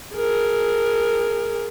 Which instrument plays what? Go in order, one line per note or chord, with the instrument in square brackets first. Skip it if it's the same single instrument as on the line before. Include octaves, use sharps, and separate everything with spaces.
[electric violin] G#4 A#4